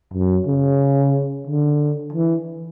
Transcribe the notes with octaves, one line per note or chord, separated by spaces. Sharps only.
F#2
C#3
D3
E3